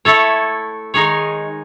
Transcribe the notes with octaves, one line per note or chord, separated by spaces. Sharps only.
A3 E4 A4 C#5
D#3 G#3 D#4 G#4 C#5